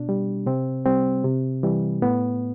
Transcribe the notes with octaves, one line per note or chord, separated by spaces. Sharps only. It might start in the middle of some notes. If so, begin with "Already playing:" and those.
Already playing: B2 D4
G3
C3 C4
G3 C4
C3
E3 G3
A2 B3